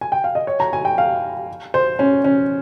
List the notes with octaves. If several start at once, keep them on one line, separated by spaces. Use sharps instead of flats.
G#5
G5
F5
D#5
C#5
A#5
G#5
G5
F5
C5
C#4
C#4